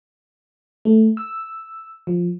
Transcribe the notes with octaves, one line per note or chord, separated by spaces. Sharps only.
A3
E6
F3